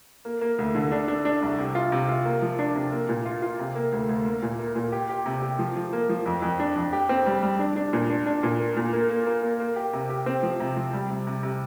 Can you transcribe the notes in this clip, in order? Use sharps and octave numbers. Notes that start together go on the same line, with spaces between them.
A#3
A#3
D2
D3
D4
D4
D4
C2
C3
F4
C3
F4
A#3
F3
D4
C3
A#3
A#2
F4
F4
C3
A#3
D2
D2
A#3
A#2
A#3
A#2
G4
G4
C3
G4
F3
F3
A#3
F3
F2
F2
D4
F2
G4
C4
G3
G3
D4
D4
A#2
D4
D4
A#2
A#3
A#2
A#3
A#3
A#3
A#3
A#3
G4
C3
G4
C4
F3
C3
F3
G3
C3
C3
C3